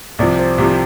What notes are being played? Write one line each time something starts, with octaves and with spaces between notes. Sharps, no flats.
C2 C3 F3 D5
C5
C2 C3 F3 G4
G4